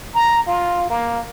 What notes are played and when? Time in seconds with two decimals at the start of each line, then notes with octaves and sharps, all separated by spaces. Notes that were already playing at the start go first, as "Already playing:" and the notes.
0.15 A#5
0.47 F4
0.90 A#3